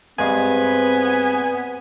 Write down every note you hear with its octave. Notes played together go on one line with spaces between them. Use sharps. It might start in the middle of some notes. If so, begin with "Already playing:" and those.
G2 G#3 B3 C4 G#5